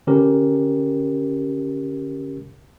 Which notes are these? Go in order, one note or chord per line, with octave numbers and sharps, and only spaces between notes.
D3 C#4 G4 A#4